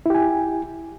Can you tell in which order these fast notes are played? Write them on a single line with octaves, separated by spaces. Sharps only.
E4 G4 G#5